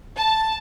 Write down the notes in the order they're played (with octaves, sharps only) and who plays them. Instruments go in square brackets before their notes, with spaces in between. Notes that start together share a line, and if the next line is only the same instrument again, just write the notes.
[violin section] A5